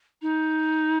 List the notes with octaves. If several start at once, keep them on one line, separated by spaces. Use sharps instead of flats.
D#4